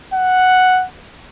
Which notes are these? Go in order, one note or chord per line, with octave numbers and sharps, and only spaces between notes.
F#5